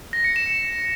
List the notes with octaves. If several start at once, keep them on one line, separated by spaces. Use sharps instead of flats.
A#6
C#7
E7